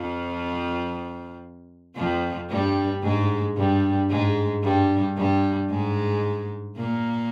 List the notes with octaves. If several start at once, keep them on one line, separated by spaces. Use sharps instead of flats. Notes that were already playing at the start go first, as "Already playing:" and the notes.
Already playing: F2 F3
F2 F3
G2 G3
G#2 G#3
G2 G3
G#2 G#3
G2 G3
G2 G3
G#2 G#3
A#2 A#3